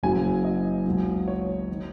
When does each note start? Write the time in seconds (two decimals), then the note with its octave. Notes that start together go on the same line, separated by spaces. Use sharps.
0.03 F#1 F#2 C#3 F#3 G#5
0.45 D#5
0.86 C#2 B2 F#3
1.28 C#5
1.72 D#3